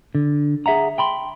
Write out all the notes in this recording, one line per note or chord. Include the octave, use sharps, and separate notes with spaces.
D3
G#4 E5 F#5 A#5
G5 B5 C6